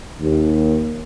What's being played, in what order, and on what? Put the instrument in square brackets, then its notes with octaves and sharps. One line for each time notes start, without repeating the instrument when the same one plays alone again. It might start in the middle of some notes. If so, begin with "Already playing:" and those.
[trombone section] D#2